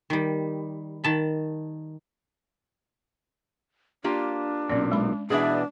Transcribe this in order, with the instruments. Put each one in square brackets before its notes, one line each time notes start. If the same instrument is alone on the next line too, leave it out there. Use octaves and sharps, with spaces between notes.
[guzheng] D#3 G3
D#3 A5 B5
[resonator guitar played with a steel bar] A#3 F4 G4 [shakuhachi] D4
[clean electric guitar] B1 E2 A#2 [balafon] C#4 D5
[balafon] G#3 B5
[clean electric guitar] B2 E3 [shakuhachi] D4 [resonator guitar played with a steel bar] G#4 D5 E5